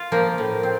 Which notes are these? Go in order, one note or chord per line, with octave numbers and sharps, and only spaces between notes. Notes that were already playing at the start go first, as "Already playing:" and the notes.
Already playing: F4
F3 A#3
A2
C4